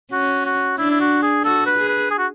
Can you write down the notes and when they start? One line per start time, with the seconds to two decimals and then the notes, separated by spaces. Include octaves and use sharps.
0.12 C#4 F#4
0.45 F#4
0.78 D4 E4
0.91 E4
1.00 F#4
1.22 G#4
1.44 F#4 A4
1.66 B4
1.78 G#4
1.88 B4
2.11 G#4
2.18 F#4